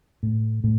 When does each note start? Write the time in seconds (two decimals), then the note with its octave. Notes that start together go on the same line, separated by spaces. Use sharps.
0.23 A2
0.64 A2